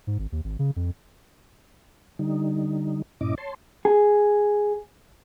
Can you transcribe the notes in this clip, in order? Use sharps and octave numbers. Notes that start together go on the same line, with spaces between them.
G#2
G#1
D#2
G#1
C#3
F2
D3 G3 D#4
G2 A#2 C#4 E4 D#5 D6
C#5 A5 C6
G#4